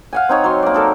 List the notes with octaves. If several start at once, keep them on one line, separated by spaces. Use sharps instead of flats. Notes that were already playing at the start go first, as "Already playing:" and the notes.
F5 F#5 G#5
C4 D#4 C#5
F#3 C6
A#3 D5
D#4 A4 A#4